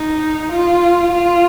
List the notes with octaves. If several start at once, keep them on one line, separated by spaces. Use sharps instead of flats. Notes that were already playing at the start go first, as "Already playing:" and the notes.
Already playing: D#4
F4
F4